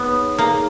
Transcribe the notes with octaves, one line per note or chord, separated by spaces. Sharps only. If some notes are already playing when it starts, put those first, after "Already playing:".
Already playing: B3 D#4 G#4 C#5
A#3 D#4 G#4 C#5